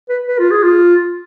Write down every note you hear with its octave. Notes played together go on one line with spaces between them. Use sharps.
B4
B4
F4
G#4
F4